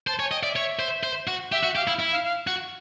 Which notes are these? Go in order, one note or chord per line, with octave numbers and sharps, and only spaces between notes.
C5 A5
C#5 G#5
D#5 G5
D5 E5
C#5
C5
C5
F#4
G4 E5
F#4
G4 F5
E4
E4
F5
F5
F#4